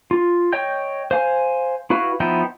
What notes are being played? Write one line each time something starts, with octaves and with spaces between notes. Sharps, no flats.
F4
C#5 D#5 G5 G6
C5 F5 G#5
E4 F#4 B4 F5
F3 B3 D#4 E4 G5